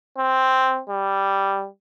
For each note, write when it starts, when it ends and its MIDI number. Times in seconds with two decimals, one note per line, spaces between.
0.18 0.80 60
0.89 1.67 55